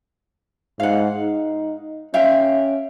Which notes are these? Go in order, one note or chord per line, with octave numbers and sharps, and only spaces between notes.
G#2 F5 F#5
D#4
C#4 E5 F5 G5